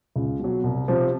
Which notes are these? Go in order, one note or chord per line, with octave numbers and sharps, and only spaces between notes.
C#2
B2 F#3
C2
C3 F3